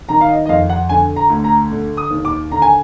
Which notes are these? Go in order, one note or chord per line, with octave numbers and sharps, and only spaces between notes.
D#3 A#5
F5
D#5
D#5
F2 F5
F#5
D3 G#5
A#5
D2
A#5
D3
D#6
D#2
D6
D3 A#5
G#5